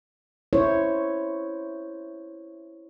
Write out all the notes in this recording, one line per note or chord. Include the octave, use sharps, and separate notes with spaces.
E4 C5 C#5